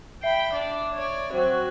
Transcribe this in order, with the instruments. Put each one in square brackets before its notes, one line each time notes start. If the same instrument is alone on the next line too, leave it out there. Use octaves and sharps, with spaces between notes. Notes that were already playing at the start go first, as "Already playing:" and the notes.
[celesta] E5 C7 [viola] G5 B5
[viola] D4 D5
C#5 D5
[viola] F#3 F#4 [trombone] C4